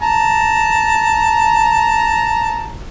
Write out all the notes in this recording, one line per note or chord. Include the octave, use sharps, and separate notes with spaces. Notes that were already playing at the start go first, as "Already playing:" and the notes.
A5 A#5